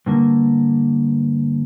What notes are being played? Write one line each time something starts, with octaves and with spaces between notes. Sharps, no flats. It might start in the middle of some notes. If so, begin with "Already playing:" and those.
G2 D3 A#3